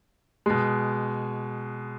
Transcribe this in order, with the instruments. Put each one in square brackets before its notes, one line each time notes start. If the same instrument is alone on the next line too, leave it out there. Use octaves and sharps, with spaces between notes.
[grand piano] B2 G#3